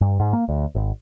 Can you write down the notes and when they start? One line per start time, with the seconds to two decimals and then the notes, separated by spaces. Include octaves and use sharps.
0.01 G2
0.20 G#2
0.33 A#3
0.49 D2
0.75 G#1